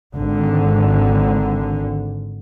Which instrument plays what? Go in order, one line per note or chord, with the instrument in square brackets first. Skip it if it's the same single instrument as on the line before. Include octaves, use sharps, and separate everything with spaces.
[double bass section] G#1 D3